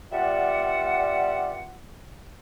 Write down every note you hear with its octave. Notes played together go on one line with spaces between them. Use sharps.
G3 B3 F4 D5 E5 F#5